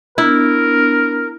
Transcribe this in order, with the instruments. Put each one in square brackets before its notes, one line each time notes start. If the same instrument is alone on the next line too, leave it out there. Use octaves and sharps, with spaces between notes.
[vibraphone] B3 D4 [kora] E4 [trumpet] A#4